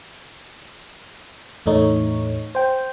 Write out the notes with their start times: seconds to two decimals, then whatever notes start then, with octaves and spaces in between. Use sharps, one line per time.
1.66 E2 A2 A3 D#4 C#5
2.55 C5 G5